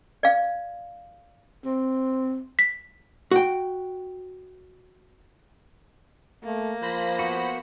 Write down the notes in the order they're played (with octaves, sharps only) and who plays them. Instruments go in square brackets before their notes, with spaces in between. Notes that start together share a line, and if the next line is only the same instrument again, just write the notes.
[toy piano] D5 F5
[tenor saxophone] C4
[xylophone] B6
[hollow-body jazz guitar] F#4 G5
[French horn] A3 [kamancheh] A#3
[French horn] F3 [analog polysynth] C5 B5 A#6
[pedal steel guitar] B3 F#4